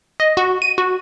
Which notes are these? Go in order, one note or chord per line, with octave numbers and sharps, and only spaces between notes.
D#5
F#4
D#7
F#4